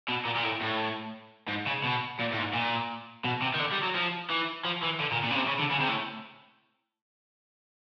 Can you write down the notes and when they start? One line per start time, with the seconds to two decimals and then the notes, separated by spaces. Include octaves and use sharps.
0.08 B2
0.25 A#2
0.35 A#2
0.43 A2
0.61 A2
1.48 G#2
1.67 C#3
1.84 B2
2.19 A#2
2.32 A2
2.37 G#2
2.54 A#2
3.25 B2
3.42 C3
3.54 D#3
3.59 D3
3.72 G3
3.83 F#3
3.95 F3
4.30 E3
4.65 F3
4.83 E3
5.00 D3
5.12 A#2
5.24 A#2
5.30 C#3
5.36 C3
5.47 C#3
5.59 D3
5.71 C#3
5.80 C3
5.88 A2